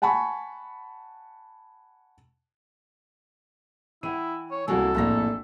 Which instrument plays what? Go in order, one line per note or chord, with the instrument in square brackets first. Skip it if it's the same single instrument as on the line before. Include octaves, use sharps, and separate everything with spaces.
[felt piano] F#5 G#5 A5 B5 C#6
[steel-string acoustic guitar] E3 [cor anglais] E4 [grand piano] F#5 G5 D#7
[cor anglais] C#5
[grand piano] C2 F#4 G#5 [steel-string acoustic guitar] E3 A#3 [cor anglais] A4
[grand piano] A#1 A#3 A#6 [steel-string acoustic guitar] F2 A2 E3